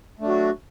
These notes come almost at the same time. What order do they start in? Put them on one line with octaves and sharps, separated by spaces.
A3 D4 F#3 F#4